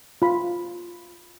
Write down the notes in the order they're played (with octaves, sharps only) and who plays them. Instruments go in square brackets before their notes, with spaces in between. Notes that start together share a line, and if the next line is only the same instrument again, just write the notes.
[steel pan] F4 B5